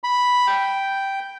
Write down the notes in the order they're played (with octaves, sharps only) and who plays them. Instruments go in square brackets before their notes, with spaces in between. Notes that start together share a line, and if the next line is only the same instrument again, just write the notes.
[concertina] B5
G5